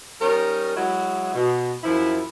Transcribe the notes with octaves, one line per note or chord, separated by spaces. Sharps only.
G3 C#4 D#4 A#4
F#3 G#3 E4 F#4
B2
F#2 F3 E4